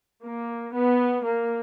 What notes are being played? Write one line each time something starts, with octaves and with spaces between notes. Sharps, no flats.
A#3
B3
A#3